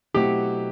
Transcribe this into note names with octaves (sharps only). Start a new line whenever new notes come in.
B2 F#3 A3 C4 E4 G4